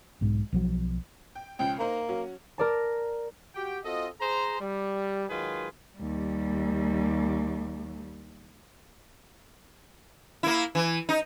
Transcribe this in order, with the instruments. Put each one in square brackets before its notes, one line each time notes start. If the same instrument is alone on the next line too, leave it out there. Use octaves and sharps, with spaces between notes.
[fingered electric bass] B1 G#2
B1 F3 F#3
[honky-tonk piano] G5
[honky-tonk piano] C#2 C#3 F3 [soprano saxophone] G5
[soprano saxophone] A#3 [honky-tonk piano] D#4 C5 A#5
[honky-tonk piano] F#3 C#4 F#4
[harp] A#4 D5 A5
[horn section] F#4 G4 G5
C4 F4 F#4 A4 D#5
G#4 C5 A#5
G3
D#3 F#3 G#3 F4 G#4 B4
[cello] D#2 G3
[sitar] A#3 E4
E3
D#4